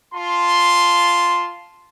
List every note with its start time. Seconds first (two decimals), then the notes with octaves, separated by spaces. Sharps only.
0.14 F4 A5 C6